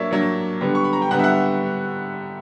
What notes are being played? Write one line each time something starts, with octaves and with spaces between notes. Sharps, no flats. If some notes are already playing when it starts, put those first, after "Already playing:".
Already playing: F#3 A#3 D4 C#5 D5 E5
F#3 A#3 D4
D3 G3 B3
C#6
B5
A#5
G5
D3 G3 B3 F#5
E5
F#5